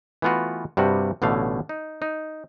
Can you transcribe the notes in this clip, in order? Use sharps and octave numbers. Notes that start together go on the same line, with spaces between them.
E3 A3 B3 F4 F#4
G2 C3 G3 F#4
A1 B2 D3 A3 F5
D#4
D#4